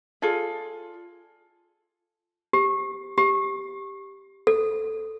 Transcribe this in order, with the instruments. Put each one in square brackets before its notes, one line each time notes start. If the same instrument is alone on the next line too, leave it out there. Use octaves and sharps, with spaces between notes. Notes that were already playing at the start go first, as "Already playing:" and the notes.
[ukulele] F4 G#4 A4 D5
[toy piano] G4
G4
A4